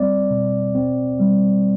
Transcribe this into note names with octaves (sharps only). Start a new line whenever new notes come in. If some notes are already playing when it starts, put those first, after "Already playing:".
Already playing: G3 C4 D5
B2
C4
G3